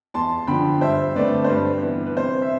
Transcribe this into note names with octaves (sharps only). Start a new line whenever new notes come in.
E2 A5 C6
D3 F3 G5 B5
G2 C5 E5
D3 A3 C4 B4 D5
C5
G2 B4
E3
B3
B4
C3 C5
E5